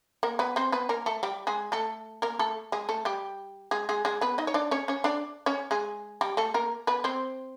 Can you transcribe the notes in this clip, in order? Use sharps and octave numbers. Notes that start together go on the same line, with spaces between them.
A#3 A#4
B3 B4
C4 C5
B3 B4
A#3 A#4
A3 A4
G3 G4
G#3 G#4
A3 A4
A#3 A#4
A3 A4
G#3 G#4
A3 A4
G3 G4
G#3 G#4
G#3 G#4
G#3 G#4
B3 B4
D#4 D#5
C#5
D4 D5
C#4 C#5
C#4 C#5
D4 D5
C#4 C#5
G#3 G#4
G3 G4
A3 A4
A#3 A#4
B3 B4
C4 C5